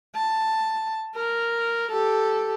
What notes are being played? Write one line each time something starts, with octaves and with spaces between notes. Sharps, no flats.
A5
A#4
G4 A4